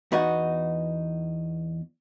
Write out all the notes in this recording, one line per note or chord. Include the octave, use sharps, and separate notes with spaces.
E2 B3 D#4 F#4